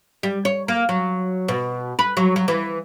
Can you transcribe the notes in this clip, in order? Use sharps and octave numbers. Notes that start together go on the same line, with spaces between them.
G3
C#5
A#3
F#3
B2
B4
F#3
F#3
E3